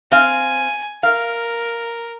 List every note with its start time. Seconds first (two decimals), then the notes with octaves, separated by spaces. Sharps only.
0.12 C4 F5 G#5
1.03 A#4 F5